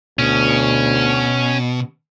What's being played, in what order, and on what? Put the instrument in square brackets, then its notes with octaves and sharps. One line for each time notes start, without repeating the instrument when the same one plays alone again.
[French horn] D2 [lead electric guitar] B2 [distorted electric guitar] C#4